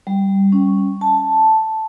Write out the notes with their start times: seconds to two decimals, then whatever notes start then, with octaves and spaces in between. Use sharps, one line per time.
0.07 G3
0.52 C#4
1.01 A5